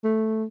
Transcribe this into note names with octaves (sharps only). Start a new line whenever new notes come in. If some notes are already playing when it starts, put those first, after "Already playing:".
A3